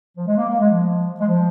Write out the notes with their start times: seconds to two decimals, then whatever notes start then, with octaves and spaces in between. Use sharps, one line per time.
0.17 F3
0.26 G#3
0.36 A#3
0.48 A#3
0.59 G#3
0.70 F3
1.19 G#3
1.26 F3